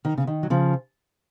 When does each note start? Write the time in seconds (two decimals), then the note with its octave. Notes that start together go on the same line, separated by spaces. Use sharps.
0.05 D#3
0.18 C#3
0.27 D#3
0.43 F#3
0.50 C#3 F3